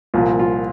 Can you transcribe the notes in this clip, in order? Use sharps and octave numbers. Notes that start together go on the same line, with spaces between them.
C2 A#2 F3 F4
F4